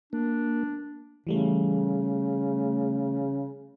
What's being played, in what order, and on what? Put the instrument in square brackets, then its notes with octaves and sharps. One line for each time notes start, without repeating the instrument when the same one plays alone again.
[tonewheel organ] A#3 [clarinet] D4
[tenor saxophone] C#3 [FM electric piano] E3 G3 A3